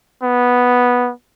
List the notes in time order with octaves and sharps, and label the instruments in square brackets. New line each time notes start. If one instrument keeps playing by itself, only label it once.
[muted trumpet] B3